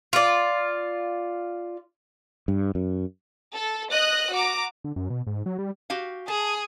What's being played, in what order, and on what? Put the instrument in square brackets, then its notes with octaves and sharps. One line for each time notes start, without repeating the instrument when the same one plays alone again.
[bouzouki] F4 D5
[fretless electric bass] G2
F#2
[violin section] A4
D#5 D#6 F#6
F#4 A#5 D6
[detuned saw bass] D3
F#2
B2
G#2
F#3
G3
[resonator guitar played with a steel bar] F#4 G4 F5
[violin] G#4 [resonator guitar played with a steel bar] A5